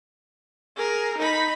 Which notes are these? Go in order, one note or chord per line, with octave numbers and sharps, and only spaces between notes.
G#4 A#4
D#4 B5